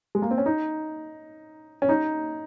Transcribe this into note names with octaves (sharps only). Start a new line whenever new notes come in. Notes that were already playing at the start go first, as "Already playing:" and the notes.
G#3
A#3
C4
C#4
D#4
C#4
D#4